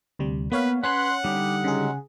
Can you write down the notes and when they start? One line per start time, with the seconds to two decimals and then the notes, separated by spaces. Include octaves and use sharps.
0.19 D2 C3 G3
0.52 A#3 B3 B4 C#5 F5
0.84 C#4 B4 C#5 F#5 B5 C6 F#6
1.24 D3 G3 D#4 G4
1.64 C#3 F#3 G#3 G#4